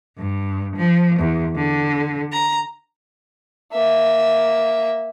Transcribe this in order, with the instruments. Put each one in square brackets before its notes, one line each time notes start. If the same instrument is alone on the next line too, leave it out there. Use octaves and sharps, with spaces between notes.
[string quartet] G2
F3
E2
D3
A#5
[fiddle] A#3 E5